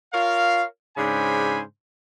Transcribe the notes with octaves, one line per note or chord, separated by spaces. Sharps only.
F4 A#4 C#5 F5
G#2 C#3 D4 C5 G#5 B5